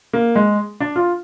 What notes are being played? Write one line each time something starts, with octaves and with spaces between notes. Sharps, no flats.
A#3
G#3
D4
F4